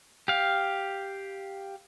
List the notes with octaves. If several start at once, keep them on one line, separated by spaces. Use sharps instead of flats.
G4 F5